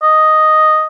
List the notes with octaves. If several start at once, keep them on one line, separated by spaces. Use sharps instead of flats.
D#5